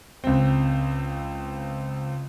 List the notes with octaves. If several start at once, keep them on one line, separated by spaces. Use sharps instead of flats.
C#2 C4